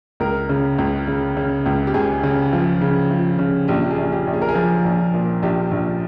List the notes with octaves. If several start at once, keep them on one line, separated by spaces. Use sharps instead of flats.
C#2 A#4
C#3
C#2
C#3
C#3
C#2
G4
C#2 G#4
C#3
F3
C#3
F3
C#3
A#1 G4
G4
G#4
A#1
G4
A#1
G#4
A#4
G#4
F3
A#1
A#2
A#1 G4
A#1